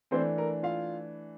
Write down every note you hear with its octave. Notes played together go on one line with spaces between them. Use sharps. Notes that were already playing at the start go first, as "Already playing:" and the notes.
E3 A3 C4 D4 C5
A#4
F4 F5